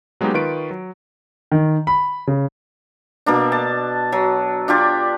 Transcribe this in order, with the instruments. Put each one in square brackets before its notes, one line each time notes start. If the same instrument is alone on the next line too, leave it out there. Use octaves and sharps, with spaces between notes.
[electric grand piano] F#3 G#3 A#3 B3 D#4 G4
D#3 F4 B4 C#6 D7
F#3
[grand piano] D#3
B5
C#3
[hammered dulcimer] B2 A#3 D4
A5
F#3
D4 F4 G4 D5